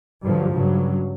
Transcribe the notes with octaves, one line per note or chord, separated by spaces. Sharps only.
G2 D3 F3 F#3
G2 C#3 F#3